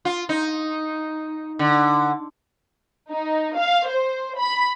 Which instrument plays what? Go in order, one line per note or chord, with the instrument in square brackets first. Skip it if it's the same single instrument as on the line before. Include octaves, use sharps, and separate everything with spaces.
[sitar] F4
D#4
D3
[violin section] D#4
F5
C5
B5